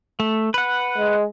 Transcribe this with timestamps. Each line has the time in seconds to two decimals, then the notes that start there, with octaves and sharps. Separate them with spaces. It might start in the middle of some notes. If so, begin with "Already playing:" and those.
0.20 A3
0.54 B4 F#5
0.98 G#3